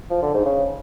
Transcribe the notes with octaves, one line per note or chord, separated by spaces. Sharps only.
F3
D3
G#2
C#3